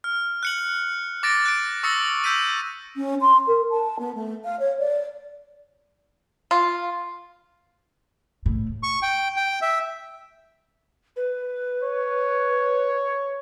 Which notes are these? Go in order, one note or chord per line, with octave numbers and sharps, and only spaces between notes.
F6
F#6 C#7 F#7
D6 A6 A#6 D7
F#6 D7
C#6 D#6 E6 A6 A#6 C#7
E6 G6 B6 D#7
C#4
C6
A#4
A5
B3
A3
F5
C#5
D5
F4
A2
C#6
G5
G5
E5
B4
C#5